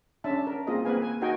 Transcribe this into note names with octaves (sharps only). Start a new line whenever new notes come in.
C#4 D4 E5 A5
A#4
A#3 C4 F4 G#4 D#5
A#3 C4 G#4 B4 F5 G#5
G#5
D#4 F#4 A#4 D#5 G5 G#5